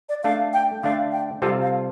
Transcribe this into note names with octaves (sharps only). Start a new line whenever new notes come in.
D5
A3 D4 A4 F5
G5
D3 A3 D4 F5
G5
C3 G3 C4 F4 A4 F5
F5